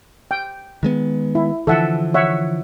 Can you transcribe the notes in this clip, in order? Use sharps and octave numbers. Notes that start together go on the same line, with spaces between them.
G5
D#3 G#3 B3
E4
D3 E3 F3 A4 E5 F#5
C#5 E5 F#5